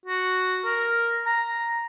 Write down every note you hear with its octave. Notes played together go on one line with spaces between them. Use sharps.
F#4
A#4
A#5